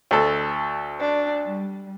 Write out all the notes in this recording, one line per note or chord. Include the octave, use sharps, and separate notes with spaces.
D2 A4
D4
G3